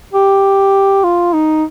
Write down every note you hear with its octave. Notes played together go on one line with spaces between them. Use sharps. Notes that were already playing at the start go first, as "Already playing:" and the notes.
G4
F4
D#4